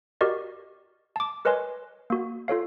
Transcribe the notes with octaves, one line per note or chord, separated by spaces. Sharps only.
F#4 G4 A#4 D5 D#5
A5 D6
A#4 B4 C#5 D#5 G#5 C6
A#3 F#4
F4 A4 C#5 F5